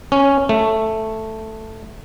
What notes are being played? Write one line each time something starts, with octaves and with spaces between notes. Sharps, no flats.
C#4
A3